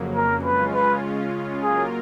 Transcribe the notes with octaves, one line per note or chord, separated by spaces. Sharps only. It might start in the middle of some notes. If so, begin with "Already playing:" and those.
Already playing: F2 C#3 F#3 A#3
A#4
C#3 G#3 C#4 F4 B4
B4
F#3 A#3 F4 G#4 A#4